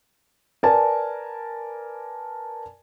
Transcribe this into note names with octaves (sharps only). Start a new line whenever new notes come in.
A#4 B4 D5 G#5 A5